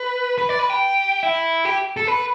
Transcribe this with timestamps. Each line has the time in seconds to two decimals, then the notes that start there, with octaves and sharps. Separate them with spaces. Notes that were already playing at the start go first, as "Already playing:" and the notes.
Already playing: B4
0.38 B4
0.49 D5
0.59 B4
0.70 G4
1.23 E4
1.65 G4
1.97 A4
2.07 B4